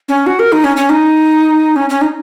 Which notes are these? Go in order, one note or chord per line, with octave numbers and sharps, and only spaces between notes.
C#4
F#4
A#4
D#4
C#4
C#4
D#4
C#4
C#4
D#4